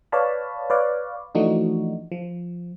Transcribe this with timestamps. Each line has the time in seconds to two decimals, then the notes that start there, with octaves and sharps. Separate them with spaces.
0.12 B4 C#5 D5 F5 A5 B5
0.70 B4 C#5 D5 F5
1.35 E3 F3 A3 D4 D#4 F#4
2.12 F3